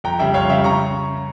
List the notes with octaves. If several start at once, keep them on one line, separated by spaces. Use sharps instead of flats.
F2 G5 A#5
C#3 G3 E5 G5
F2 C#5 F5
C#3 G3 E5 G5
C#3 A#5 C#6